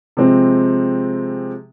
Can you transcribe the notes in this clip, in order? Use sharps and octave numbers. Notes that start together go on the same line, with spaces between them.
C3 F3 G#3 C4